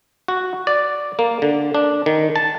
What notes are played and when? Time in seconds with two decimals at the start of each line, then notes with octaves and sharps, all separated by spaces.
0.28 F#4
0.67 D5
1.19 A#3
1.42 D3
1.75 D4
2.06 D#3
2.36 A5